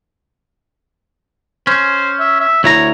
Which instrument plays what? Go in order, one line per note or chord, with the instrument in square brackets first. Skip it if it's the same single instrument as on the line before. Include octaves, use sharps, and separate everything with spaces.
[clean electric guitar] C#4 [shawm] C5
[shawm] E5
E5
[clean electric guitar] D2 E4 A#5 [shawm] C#5